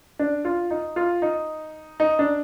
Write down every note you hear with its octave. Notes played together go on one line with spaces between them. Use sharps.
D4
F4
D#4
F4
D#4
D#4
D4